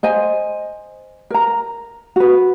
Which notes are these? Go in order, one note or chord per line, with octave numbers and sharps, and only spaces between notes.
C5 D#5 G#5
A#4 A#5
F#4 B4